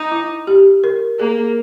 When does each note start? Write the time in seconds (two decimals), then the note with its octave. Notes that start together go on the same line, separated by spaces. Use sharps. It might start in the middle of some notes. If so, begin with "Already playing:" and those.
Already playing: D#4
0.11 E4
0.47 G4
0.84 A#4
1.19 A#3 G#4